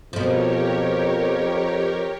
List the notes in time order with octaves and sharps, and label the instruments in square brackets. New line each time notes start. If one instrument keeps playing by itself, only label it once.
[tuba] F2 [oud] B2 F3 [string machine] G4 A#4 C#5